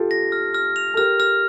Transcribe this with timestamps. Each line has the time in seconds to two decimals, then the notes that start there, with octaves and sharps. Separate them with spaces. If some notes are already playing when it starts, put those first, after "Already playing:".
Already playing: F4 G4 A4
0.11 A#6
0.32 F6
0.54 F6
0.76 F7
0.94 A4
0.97 G4 A#4 F6
1.20 F6